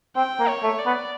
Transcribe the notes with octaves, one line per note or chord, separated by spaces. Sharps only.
C4 G5
A#3
C#5
A3
D5
B3